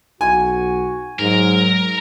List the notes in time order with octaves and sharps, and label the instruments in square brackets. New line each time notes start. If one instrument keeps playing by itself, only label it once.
[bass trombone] B1 [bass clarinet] F#4 [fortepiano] G#5
[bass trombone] G#2 [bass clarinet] F#3 [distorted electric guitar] A#4